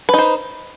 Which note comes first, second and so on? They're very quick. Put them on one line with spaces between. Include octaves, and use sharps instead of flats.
B4 D#4 C5